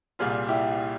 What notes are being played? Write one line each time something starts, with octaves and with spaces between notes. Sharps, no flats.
C2 A#2 G3 F4 G#4
E4 G4